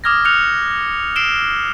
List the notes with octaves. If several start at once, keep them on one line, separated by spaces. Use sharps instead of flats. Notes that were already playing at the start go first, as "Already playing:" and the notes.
D6 D#6 F6 G#6 A#6
F6 F#6 C#7 F7
E6 C7 D7 E7 G7